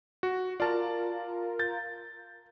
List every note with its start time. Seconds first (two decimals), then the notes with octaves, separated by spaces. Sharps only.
0.23 F#4
0.60 F4 A#4 D5 A5
1.59 G6 A6